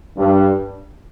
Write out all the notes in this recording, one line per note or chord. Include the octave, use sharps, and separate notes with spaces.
G2